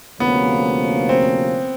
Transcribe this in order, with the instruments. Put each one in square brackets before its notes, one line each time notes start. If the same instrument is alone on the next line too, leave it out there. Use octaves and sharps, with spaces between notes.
[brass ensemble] D2 C3 F3 A#3 C#4 [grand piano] B3
[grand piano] C4